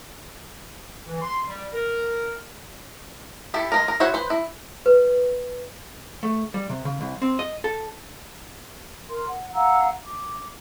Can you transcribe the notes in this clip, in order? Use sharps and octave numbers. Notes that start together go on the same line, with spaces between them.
E3
C6
G3
A#4
E4 G4 A4
G#3 A#3 A#4
A#4
E4 F#4 C5 C#5 F#5
B4 C5
E4
B4
A3
G3
C3
C#3
C2
C4
D#5
A4
A#4 C6
F#5
F5 F#5 A#5 E6
D6